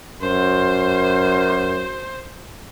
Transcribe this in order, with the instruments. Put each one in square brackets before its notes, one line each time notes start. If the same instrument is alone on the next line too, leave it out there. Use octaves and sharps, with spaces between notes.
[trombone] F#2 [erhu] C5